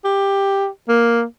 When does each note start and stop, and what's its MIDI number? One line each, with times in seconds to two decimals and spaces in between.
0.05 0.68 67
0.88 1.24 58